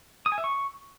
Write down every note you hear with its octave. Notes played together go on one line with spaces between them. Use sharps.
D#6
G#5
E5
C#6